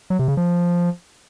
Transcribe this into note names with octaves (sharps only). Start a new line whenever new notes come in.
F#3
C3
C#3
F3